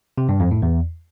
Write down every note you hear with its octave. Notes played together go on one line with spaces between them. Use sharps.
C3
G2
F2
A2
E2